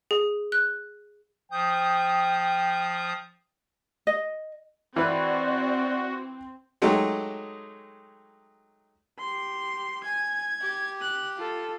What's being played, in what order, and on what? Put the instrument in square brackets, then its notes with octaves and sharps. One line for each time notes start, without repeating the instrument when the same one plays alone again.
[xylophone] G#4
F#6
[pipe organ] F3 D#6 G6 [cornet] G5
[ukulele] D#5
[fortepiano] E3 B4 B5 [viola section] C4 [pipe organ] F#4 [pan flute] D5
[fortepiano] F#3 G#3 A3 D#4 G4
[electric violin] G4 C6
[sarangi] G#5 [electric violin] G#6
[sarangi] G4
[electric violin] F#6
F4 A4